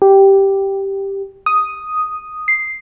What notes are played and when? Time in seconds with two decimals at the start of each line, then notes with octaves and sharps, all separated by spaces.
0.02 G4
1.46 D#6
2.48 C7